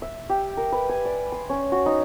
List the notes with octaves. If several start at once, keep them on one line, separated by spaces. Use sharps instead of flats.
E5
G4
A#4
B4
G#5
D5
C6
C#4
F#4
D#4